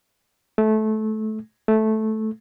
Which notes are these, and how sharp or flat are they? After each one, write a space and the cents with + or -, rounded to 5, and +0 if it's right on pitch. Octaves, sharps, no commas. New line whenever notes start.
A3 -20
A3 -10